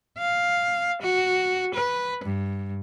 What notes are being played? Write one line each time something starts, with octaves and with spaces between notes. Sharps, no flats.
F5
F#4
B4
G2